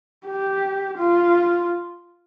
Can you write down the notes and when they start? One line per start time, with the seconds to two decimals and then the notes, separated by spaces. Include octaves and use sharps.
0.27 G4
0.98 F4